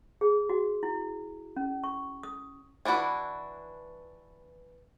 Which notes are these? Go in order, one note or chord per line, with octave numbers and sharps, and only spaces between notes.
G#4
F#4
E4
C#4
C#6
D#6
E3 D4 E4 F#4 B4